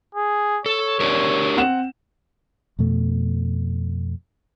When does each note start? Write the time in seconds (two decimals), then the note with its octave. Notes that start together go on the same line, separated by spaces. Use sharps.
0.15 G#4
0.66 A4 C#5
1.00 D4 G4 A#4
1.57 C4 F#5 E7
2.79 F2 B2 A3